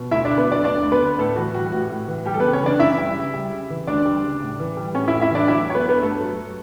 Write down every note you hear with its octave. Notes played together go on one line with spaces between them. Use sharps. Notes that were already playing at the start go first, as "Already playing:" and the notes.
Already playing: B2
D2 E4 E5
D3 D4 D5
B3 B4
F#3 D4 D5
D2 D4 D5
D2
B3 B4
D3
A2 A3 A4
E3 F#4
G3 F#4
A2 F#4
A2
E3
G3 G4
A4
C#3 B3 B4
C#4 C#5
E3 D4 D5
F#2 E4 E5
G3
C#3
G3
C#3
E3
D2 D4 D5
G3
C#3
A2
E3
G3
A2 C#4 C#5
E4 E5
A2
E4 E5
E3 D4 D5
F#3 E4 E5
F#3 C#5
B3 B4
G2 B3 B4
G2 A3 A4
F#3
F#3